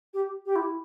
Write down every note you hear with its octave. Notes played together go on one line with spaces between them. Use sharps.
G4
G4
E4